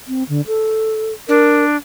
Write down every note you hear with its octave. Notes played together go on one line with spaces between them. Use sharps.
C4
D3
A4
D4 A#4